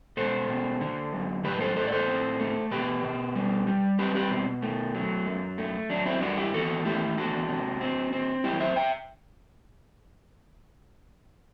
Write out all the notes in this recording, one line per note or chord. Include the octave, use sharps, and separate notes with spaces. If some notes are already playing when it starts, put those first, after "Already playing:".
B2 A4 C5
B2
D3
F#2
A2 G4 B4
A4 C5
A2 A4 C5
D5
A4 C5
C4
A3
B2 G4 B4
B2
G3
G3
C4 G4 B4
G4 B4
B2 C4
A3
F#3
F#2
A3
F#3 D4
C4 E4
G2 D4 F#4
E4 G4
E2 F#4 A4
A3 E4 G4
E2 D4 F#4
C3
C4
C4
F#2 E4 G4
C5 E5
E5 G5